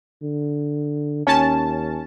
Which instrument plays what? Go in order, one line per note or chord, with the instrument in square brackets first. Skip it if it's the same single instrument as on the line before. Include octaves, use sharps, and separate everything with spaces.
[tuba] D3
[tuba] D#2 [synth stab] C#4 A5